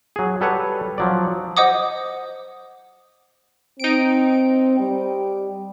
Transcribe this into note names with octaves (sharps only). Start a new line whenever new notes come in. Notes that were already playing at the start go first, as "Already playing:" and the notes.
F#3 G#4
G3 A4 B4 C#5 F#5
F3 F#3 D5
C5 D#5 F#5 D6 D#6
C4 D#4 D7
G3